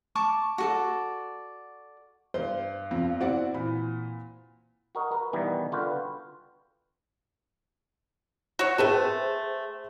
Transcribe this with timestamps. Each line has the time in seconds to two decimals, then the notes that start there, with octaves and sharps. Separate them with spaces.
0.15 A5 C#6 D6
0.58 F#4 A4 D5
2.34 G2 C5
2.91 F2
3.21 C4 E4 F#4 D5 F#5
3.54 A#2 E3 B5
4.95 F#4 A#4 D#5
5.12 A#4 B4
5.33 B2 D#3 E3 G3 B3
5.72 D3 F4 F#4 B4 G5
8.59 F#4 C#5
8.78 A3 G#4 B4 C5 G5 A5